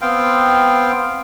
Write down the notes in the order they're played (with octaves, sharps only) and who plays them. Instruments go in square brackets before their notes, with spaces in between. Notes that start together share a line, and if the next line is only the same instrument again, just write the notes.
[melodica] B3 C4 F5 G5